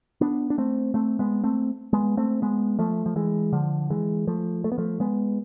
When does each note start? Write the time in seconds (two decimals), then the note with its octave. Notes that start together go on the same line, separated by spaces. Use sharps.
0.21 B3 D4
0.50 D4
0.58 A3 C4
0.94 A3 C4
1.19 G#3 B3
1.44 A3 C4
1.93 G#3 B3
2.17 A3 C4
2.42 G#3 B3
2.79 F3 A3
3.06 F3
3.16 E3 G#3
3.53 D3 F3
3.90 E3 G#3
4.27 F3 A3
4.64 A3
4.72 B3
4.78 F3 A3
5.00 G#3 B3